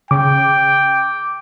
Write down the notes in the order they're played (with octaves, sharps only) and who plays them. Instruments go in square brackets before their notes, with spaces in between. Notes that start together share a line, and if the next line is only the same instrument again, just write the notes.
[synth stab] C#3 [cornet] G5 [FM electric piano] D6